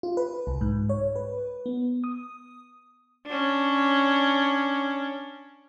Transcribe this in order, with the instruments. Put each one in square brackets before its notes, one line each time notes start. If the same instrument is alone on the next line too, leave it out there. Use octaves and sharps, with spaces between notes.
[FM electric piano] F4
B4
C2
G#2
C#5
B4
B3
D#6
[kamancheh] C#4 D4